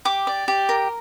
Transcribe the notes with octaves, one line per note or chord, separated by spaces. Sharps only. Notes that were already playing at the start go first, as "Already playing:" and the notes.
G4 D6
D5
G4
A#4